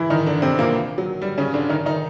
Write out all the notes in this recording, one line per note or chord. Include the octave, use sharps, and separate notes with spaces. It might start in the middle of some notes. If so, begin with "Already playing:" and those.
Already playing: E3 E4
D#3 D#4
D3 D4
C3 C4
A#2 A#3
F#3
G3
C#3 C#4
D3 D4
D#3 D#4
D#3 D#4